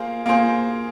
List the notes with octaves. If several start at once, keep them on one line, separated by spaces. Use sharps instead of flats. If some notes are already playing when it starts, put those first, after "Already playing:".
Already playing: A#3 F4 G#4 C5
A#3 F4 G#4 C5